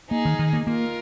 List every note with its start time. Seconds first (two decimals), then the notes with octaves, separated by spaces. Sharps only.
0.10 A#3 D#4 G#4
0.25 D#3
0.39 D#3
0.53 A#3
0.67 A#3 F4 A#4